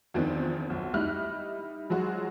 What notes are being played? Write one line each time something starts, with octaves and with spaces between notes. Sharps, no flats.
E2 D#3 F3 C4 D4
B1
G3 D#4 E4 F6 F#6
F3 F#3 G#3 F#4